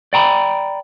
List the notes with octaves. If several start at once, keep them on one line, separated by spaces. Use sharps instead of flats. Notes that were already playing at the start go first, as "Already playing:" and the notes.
D5 G5 A#5 B5